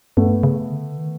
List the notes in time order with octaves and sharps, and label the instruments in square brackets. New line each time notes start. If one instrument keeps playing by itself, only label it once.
[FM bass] G2 [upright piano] A3 B3
[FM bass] C#3
D3
D#3